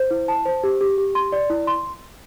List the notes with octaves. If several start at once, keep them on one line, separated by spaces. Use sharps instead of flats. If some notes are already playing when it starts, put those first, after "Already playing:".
Already playing: C5
E4
A5
C5
G4
G4
G4
C6
D5
E4
C6